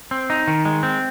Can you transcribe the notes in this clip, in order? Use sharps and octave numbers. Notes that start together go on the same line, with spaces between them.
C4
D#4
D#3
G#3
C4